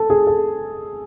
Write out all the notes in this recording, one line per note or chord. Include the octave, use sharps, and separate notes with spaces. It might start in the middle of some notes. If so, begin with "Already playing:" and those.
Already playing: A4
G#4
A4